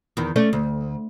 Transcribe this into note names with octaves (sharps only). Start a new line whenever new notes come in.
E2 D#3
A3 C#4 D5
D2